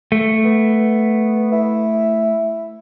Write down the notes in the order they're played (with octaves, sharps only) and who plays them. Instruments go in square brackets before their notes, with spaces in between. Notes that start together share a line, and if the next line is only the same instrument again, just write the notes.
[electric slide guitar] A3
[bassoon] B3
E4